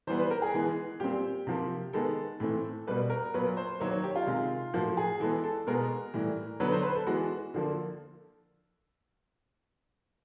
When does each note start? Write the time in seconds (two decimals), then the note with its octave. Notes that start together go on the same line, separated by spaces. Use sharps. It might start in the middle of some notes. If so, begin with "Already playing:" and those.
0.07 E3 G3 B3 C5
0.19 B4
0.31 A#4
0.42 G#4
0.54 E3 G#3 B3
1.00 A#2 G3 C4 G4
1.47 C3 F3 A#3
1.93 D#3 G#3 B3 A4
2.40 A2 E3 A3 C4
2.87 B2 G3 A#3 B4
3.10 A#4
3.34 A#2 F#3 B3 B4
3.57 C5
3.80 D#3 F#3 A#3 C#5
3.91 C#5
4.04 G4
4.16 F4
4.27 C3 D#3 G#3
4.73 A2 F3 A#3 F#4
4.97 G#4
5.20 E3 G#3 B3 A4
5.44 A4
5.67 B2 G#3 B3 A#4
6.14 A2 E3 G3
6.60 D3 F#3 B3 B4
6.72 C5
6.83 B4
6.95 A4
7.07 E3 G#3 B3 F#4
7.54 D3 F3 A#3